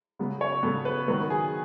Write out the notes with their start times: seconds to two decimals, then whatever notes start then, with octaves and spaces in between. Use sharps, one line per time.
0.19 C#3 F#3 B3
0.41 C#5
0.63 C#3 F#3 B3 A4
0.85 B4
1.08 D#3 F#3 B3 B4
1.30 G#4